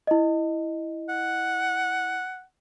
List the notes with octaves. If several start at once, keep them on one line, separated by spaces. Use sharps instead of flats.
E4 D#5
F#5